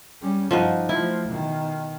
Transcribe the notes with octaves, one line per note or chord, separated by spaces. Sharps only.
G3 C#4
G2 F3 D#4 F#4
F3 A3 E4
B2 D#3